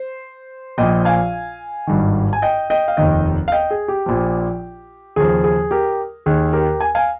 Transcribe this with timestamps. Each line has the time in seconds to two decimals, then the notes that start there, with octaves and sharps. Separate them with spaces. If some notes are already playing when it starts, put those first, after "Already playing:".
Already playing: C5
0.78 A#1 A#2 F3 D#5 G5
1.05 F5 G#5
1.87 G#1 G2 D#3
2.33 G#5
2.42 D#5 G5
2.70 D#5 G5
2.88 F5
2.97 F1 D#2 D#3 D#5 G5
3.48 F5
3.52 D#5 G5
3.71 G#4
3.88 G4
4.06 A#1 A#2 F3
5.16 D#2 C#3 F3 G#4
5.44 G#4
5.71 G4 A#4
6.26 D#2 D#3 G#4
6.53 G4 A#4
6.80 G#5
6.95 F5 G#5